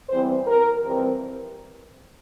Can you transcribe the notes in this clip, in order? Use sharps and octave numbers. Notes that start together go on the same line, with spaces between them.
E2 E3 G3 C4 C5
A#4
F2 C3 E3 G3 C4